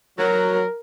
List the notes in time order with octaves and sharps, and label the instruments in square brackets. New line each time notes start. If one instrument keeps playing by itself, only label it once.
[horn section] F#3 [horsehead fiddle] A#4